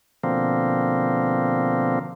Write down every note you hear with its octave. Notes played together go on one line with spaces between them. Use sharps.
B2 D3 F3 A#3 C4